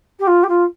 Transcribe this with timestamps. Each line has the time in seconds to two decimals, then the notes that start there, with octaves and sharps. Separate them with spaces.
0.19 G4
0.27 F4
0.43 G4
0.48 F4